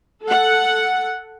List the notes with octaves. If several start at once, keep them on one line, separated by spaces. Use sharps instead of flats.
A4 F#5